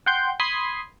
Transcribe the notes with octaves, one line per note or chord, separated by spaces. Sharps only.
F#5 G5 C6 G6
B5 C6 D#6 G#6 C7